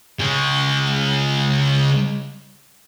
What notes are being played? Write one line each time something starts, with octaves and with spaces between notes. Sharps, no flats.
C#3 G#3